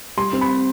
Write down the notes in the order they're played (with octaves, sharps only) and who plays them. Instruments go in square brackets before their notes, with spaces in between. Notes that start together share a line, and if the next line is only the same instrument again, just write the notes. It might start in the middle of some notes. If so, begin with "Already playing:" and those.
[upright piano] G3 C6
C4
B5